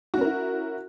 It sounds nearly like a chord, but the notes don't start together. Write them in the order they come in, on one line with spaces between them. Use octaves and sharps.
F#4 C#4 A#4 E4